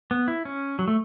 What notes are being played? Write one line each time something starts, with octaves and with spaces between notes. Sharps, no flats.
B3
E4
C#4
F#3
A3